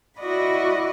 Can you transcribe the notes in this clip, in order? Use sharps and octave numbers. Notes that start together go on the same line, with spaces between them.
E4 F#4 D5 D#5 B5